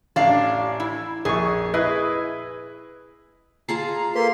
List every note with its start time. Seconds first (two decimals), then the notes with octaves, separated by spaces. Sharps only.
0.16 A1 D4 D5 F5
0.80 E4
1.25 A#1 G#4 C#6
1.74 E4 G#4 B4 D#5
3.69 F4 G#4 A5 A#5 C7
4.15 A#3 A4 B4 C6